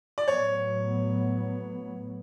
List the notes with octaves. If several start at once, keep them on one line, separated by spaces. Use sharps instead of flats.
D5
A2 F#3 B3 C#5